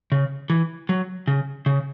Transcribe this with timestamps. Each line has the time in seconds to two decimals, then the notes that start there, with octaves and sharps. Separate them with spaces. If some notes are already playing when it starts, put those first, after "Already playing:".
0.12 C#3
0.50 E3
0.89 F#3
1.27 C#3
1.66 C#3